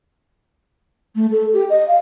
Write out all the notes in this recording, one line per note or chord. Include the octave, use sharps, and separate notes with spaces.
A3
A4
G4
D#5
F5